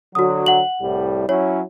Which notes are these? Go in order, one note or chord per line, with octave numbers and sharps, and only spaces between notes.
D3 F#3 F#4 D#6
F#5 F#7
C2 A2 G3
F#3 C#4 E4 C#5